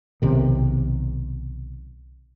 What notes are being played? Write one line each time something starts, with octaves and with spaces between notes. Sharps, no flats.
B1 C3 D#3